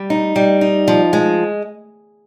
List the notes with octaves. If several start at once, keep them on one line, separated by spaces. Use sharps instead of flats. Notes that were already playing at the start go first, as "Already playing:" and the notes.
Already playing: G3
D#4
G3
D#4
F3
G#3